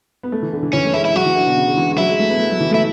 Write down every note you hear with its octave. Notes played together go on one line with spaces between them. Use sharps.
B3
A3
E3
D3
E3
E3 C#4
A3
G#3 E4
E4
F#3 F#4
E3
D3
B2
C#3
D3
E3
G#3
F#3 E4
G#3
A3
B3
A3
F#3
E3
A3 E4